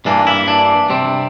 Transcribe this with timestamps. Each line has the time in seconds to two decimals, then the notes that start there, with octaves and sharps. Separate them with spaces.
0.05 G2 E3 A#3 D4
0.27 E4
0.48 D4
0.90 C3 G3 C4